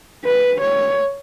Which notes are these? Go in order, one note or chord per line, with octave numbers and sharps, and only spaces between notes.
B4
C#5